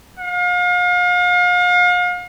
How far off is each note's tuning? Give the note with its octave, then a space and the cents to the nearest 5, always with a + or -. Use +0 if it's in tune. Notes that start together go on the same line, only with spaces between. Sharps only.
F5 +40